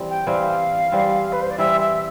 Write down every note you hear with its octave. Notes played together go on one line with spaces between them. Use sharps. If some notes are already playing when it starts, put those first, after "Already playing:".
Already playing: E3 G3 C4
G5
E3 G3 C4 F5
E3 G3 C4
B4
C5
D5
E3 G3 C4 E5
E5